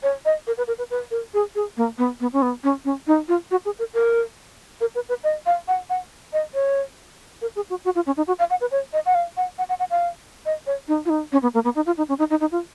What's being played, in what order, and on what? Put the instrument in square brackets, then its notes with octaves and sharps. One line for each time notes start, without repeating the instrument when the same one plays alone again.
[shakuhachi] C#5
D#5
A#4
B4
A#4
B4
B4
A#4
G#4
G#4
A#3
B3
B3
C#4
B3
C#4
C#4
D#4
F4
F#4
G#4
A#4
A#4
A#4
B4
B4
D#5
F5
F#5
F#5
D#5
C#5
A#4
G#4
F#4
F#4
F4
C#4
D#4
F#4
F5
F#5
B4
C#5
D#5
F#5
F5
F#5
F#5
F#5
F#5
F5
D#5
C#5
D#4
F4
D#4
C#4
B3
A#3
B3
D#4
F4
D#4
C#4
D#4
D#4
D#4
F4